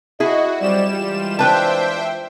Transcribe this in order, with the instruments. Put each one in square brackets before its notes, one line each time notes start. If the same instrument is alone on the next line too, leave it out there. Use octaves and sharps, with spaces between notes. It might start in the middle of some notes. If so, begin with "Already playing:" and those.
[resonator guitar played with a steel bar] E4 G#4 [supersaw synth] F#4 [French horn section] D#5
[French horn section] F#3 C4 D5 [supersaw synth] G3 E7
[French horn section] E3 G#3 F4
[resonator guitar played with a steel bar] D4 B4 A5 [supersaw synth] C5 E5 G5